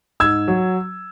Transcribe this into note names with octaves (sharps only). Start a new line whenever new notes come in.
G#2 E6 G#6
F#3